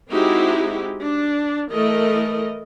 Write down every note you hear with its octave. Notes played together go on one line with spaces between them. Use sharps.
G#3 C4 D#4 E4 F#4 G4
D4
E3 A3 A#4 D#5